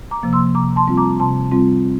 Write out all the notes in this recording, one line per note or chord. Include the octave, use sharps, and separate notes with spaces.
A#5 D6
C3 F3 A#3
C6 E6
C3 A#5 D6
A5 C6
G3 C4 F4
A#5 D6
C3 A5 C6
G3 C4 F4